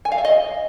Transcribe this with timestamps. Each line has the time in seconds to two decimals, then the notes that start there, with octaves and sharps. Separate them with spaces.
0.05 G#5
0.12 F5
0.18 E5
0.25 D#5